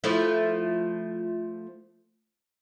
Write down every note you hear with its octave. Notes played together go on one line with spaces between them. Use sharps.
F3 A3 E4